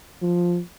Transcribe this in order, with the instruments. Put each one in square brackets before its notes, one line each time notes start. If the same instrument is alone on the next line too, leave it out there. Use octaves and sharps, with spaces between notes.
[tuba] F3